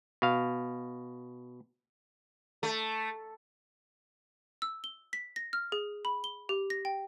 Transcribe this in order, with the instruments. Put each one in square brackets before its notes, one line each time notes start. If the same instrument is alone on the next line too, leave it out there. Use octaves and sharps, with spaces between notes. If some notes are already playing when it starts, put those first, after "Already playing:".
[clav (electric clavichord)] B2 F5
[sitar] A3
[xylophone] E6
G7
B6
A#6
F6
G#4
B5
G7
G4
A#6
G5